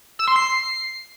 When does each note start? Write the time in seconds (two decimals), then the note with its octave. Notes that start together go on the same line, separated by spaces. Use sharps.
0.19 E6
0.28 C6
0.36 C7